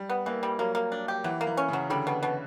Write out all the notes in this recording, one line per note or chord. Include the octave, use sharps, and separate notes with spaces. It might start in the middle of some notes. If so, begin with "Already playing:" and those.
Already playing: G3
B3
E3 A#3
G3
F#3 A#3
A#3
D4
G4
E3 F#3
A#3
E3
C#4
C#3 F#3
D3 G3
B2
B2